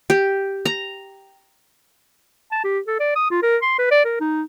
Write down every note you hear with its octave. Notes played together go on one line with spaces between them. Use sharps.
G4
A#5
A5
G4
A4
D5
D#6
F4
A#4
C6
B4
D5
A#4
D#4